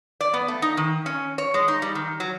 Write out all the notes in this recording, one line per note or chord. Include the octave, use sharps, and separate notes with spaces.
D5
B3
A3
D#4
D#3
C#4
C#5
G#3
D#4
G3
D#3
F#3